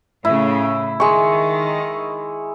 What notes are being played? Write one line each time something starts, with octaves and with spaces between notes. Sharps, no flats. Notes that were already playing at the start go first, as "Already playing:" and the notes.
A2 C#3 E4
D#3 G#3 C#6